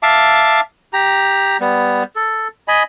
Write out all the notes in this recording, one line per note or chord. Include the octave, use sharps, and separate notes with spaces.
E5 F5 A5 D6
G4 A#5
G3 B3
A4
D#5 G#5 B5